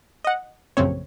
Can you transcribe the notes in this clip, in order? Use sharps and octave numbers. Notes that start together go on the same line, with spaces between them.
D#5 F#5
A#1 F#2 C#3 A3 C4 C#5